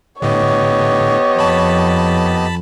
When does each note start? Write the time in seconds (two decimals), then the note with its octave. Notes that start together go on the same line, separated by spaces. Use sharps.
0.22 A2 D3 B3 G4 C#5 D#5
1.39 F2 A5 B5